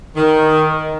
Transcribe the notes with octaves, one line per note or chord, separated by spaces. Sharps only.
D#3